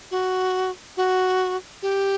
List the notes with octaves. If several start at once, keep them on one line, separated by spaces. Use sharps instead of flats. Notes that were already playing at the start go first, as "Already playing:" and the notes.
F#4
F#4
G4